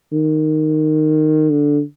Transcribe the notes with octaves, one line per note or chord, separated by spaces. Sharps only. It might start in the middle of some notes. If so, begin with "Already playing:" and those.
D#3
D3